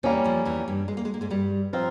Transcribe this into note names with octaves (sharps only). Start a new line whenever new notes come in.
E2 E3 G3 A#3 C#4
F2 F3
E2 E3
G2 G3
G#3
A#3
G#3
A#3
G#2 G#3
G2 G3
F3 C4 F4 A#4